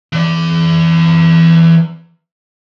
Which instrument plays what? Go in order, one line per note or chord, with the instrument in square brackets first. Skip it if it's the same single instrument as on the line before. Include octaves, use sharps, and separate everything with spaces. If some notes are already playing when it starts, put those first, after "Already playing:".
[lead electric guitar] E3 D5